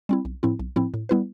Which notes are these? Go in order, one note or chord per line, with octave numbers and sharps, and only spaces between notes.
G3 C4 E4
B1
A2 F3 C4 E4
B1
A2 F3 C4 E4
A2
G3 B3 E4 B4